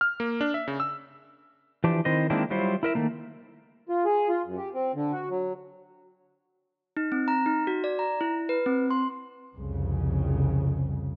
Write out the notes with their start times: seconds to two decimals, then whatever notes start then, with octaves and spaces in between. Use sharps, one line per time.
0.01 F6
0.20 A#3
0.41 D4
0.54 E5
0.68 C#3
0.80 E6
1.84 E3 F3 D4 G4
2.05 D#3 C4 E4 C5 D#5
2.30 D#3 G#3 A#3 C4 D4 E4
2.50 F#3 G3 E4 F4 C5
2.83 E4 A#4 E5
2.95 D#3 A3 A#3
3.89 F4
4.05 G#4
4.29 F4
4.45 F#2
4.57 G4
4.74 C4
4.94 D3
5.12 F#4
5.30 F#3
6.97 D#4
7.12 C4
7.28 A#5
7.46 D#4
7.67 F#4
7.84 D5
7.99 A#5
8.21 E4
8.49 B4
8.66 C4
8.91 C6
9.54 C2 F2 C#3